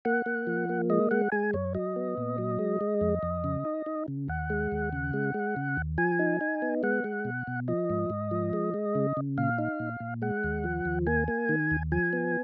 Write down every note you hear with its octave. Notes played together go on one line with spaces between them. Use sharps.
A#3 F#5
A#3
F3
A#3
G#3 D#5
G#3 F#5
G#3 G#5
F#2 C#5
F#3 D#5
B3
A#2
F#3
G#3
G#3
F2
F2
C#3
D#4
D#4
C#3
D#2 F#5
G#3
D#2
C#3
G#3
G#3
C#3
D#2
F3 G#5
D#4
D#4
B3
G#3 F#5
G#3
B2
B2
F3 D#5
G#2
G#2
F3
G#3
G#3
C#3
C#3
A#2 F5
D#4
A#2
A#2
G#3 F#5
D#2
F3
D#2
A#3 G#5
A#3
D#3
D#2
F3 G#5
B3